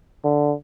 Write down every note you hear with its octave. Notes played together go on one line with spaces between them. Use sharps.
D3